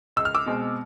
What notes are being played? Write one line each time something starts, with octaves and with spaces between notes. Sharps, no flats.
C#2 E6
F6
D6 E6
B2 G#3 C4